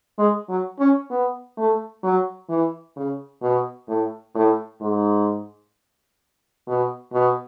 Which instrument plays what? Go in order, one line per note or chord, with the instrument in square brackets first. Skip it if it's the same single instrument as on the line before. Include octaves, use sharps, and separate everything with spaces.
[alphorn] G#3
F#3
C#4
B3
A3
F#3
E3
C#3
B2
A2
A2
G#2
B2
B2